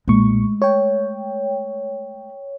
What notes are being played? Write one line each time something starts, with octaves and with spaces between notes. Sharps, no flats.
B1 A#2 G#3 A3 C#6
C#5 G5